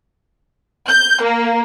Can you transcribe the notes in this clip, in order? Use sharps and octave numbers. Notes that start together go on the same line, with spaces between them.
G6
A#3